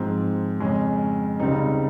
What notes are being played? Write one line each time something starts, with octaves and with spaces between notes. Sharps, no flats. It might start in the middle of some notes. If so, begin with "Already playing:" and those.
Already playing: G#2 F3 C4
F2 C#3 G#3 C#4
C#2 C#3 G3 C4 D#4